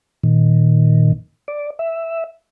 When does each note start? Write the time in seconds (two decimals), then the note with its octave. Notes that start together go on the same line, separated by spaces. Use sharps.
0.24 A#2 D#3
1.48 D5
1.79 E5